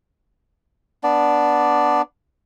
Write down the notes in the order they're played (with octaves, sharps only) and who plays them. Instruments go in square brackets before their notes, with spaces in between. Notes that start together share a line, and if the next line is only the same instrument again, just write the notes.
[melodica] B3 D4 D5